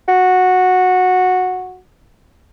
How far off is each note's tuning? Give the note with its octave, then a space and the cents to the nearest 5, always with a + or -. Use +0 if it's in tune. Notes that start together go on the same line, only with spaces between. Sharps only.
F#4 -10